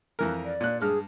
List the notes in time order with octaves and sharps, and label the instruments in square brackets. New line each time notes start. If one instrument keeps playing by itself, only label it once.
[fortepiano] F2 E3 A#4
[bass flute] D5
[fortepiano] A#2 F#6
[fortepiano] G2 F6 [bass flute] G#4